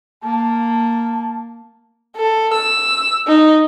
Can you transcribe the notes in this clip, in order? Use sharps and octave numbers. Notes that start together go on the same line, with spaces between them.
A#3 A5
A4
E6
D#4